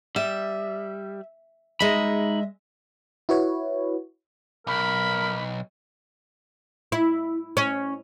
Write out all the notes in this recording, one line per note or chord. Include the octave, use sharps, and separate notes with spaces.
G3 E5
G#3 D#4 D#5 E5 B5
E4 F#4 B4 C#5
B1 A#4 B5
E4
C#4